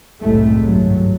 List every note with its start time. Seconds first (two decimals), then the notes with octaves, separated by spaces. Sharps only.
0.21 F#1 C2 A2 C3 G#3 A3
0.63 G#1 G2 F#3